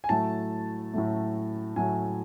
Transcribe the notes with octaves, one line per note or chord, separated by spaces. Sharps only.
G#5
A2 F#3 A3 A5
A2 F#3 A3
A2 F#3 A3 G#5